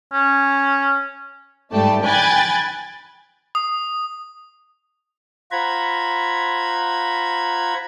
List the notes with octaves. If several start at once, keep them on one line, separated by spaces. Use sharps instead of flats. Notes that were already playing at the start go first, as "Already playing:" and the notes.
C#4
G#2 G3 A3 D5 G5 A5
G5 G#5 B5 F#6 G#6 A6
D#6
F4 C5 F#5 A#5 B5 G#6